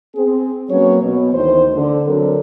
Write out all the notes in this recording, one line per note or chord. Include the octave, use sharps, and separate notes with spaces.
C4 G#4
F#3 A#3 C#4 B4 C#5
B2
D2 D#3 E3 C5
D3
D3 F#3 C4 D4 A4 A#4